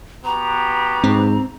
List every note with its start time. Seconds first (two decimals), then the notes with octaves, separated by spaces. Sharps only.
0.25 B3 F#4 G4 A#5
1.04 G#2 C4